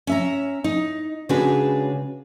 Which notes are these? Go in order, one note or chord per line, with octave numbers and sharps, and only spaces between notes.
C#4 E5 A#5
D#4
C#3 G#3 D4 F#4 G#4 B4